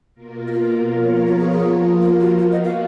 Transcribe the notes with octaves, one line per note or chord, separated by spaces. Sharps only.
B2 A#3 F4 A#4
F#4
F4
F3 B3 F4 A#4 C#5
F#4
G#4
G#4
F3 A#3 F4 A#4
A#4
F#4
F3 B3 F4 F#4
D#5
F5